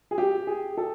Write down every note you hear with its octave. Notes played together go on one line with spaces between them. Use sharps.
G#4
G4
G#4
A4